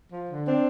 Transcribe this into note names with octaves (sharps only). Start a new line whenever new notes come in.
F3
D3
C4 D4